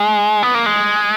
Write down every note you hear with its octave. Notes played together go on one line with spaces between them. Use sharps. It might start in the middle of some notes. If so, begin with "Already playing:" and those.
Already playing: G#3
B3
A#3
G#3